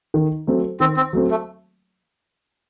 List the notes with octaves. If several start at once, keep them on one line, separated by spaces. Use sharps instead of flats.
D#3
F#3 A3 C4
D#3 C4
C4
F#3 A3 C4
A3